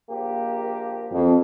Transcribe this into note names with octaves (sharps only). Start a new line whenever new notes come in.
A#1 A#3 G4
F2